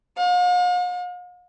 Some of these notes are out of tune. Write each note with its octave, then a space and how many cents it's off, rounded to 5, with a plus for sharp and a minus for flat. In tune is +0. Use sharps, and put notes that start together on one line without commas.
F5 +45